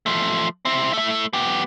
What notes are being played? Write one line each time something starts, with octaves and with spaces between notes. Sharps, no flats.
F3 A3
C4 E4
A3 E4
B3 G4